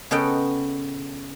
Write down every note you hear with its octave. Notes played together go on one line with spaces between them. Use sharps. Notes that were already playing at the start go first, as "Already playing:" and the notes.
C#3 B3 A4 D#5 F#5 G5